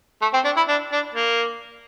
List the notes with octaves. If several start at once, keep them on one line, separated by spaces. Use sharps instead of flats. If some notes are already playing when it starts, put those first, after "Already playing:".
A3
C4
D4
E4
D4
D4
A#3